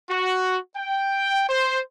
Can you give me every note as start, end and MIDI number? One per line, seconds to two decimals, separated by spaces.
0.10 0.58 66
0.76 1.44 79
1.48 1.80 72